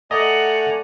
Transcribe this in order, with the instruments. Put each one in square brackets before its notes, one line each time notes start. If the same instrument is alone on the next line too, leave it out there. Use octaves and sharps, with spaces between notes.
[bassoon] A3 [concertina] D5 G#5 A#5 [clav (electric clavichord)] D#5 [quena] F#5